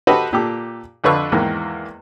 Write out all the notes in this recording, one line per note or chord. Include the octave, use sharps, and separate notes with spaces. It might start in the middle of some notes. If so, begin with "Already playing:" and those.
F#4 G4 A4 B4 C5 D#5
A#2 G4 A4 D6
F2 D3 F4 B4 C#6 E6
E2 G#2 D#3 E3 A#3